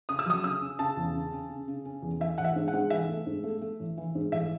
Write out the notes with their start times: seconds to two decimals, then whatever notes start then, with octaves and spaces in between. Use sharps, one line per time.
0.09 C#3 D#6
0.19 E6
0.26 F#3 D#6
0.44 C#3 E6
0.61 C#4
0.79 C#3 A5
0.97 E2
1.15 C#3
1.33 C#4
1.49 C#3
1.68 C#3
1.85 C#4
2.02 E2
2.20 E3 E5
2.38 A1 F#5
2.44 E5
2.56 G#2
2.68 F#5
2.73 G#2
2.90 E3 E5
3.08 A3
3.26 G#2
3.44 A3
3.62 A3
3.80 A1
3.97 E3
4.15 G#2
4.32 A1 E5